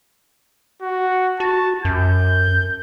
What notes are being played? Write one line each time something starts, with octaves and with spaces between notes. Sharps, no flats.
F#4
F#4 A5
F#2 G6